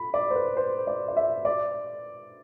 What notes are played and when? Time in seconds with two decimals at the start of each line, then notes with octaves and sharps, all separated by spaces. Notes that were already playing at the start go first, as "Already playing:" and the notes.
Already playing: B5
0.14 D5
0.30 C5
0.35 B4
0.57 C5
0.87 D5
1.08 D5
1.16 E5
1.45 D5